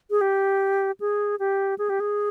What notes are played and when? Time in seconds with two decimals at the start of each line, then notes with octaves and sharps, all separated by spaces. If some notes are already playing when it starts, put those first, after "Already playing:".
0.11 G#4
0.21 G4
1.00 G#4
1.39 G4
1.78 G#4
1.90 G4
2.00 G#4